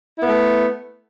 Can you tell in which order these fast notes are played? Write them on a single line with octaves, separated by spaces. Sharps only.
E4 B3 B4 A3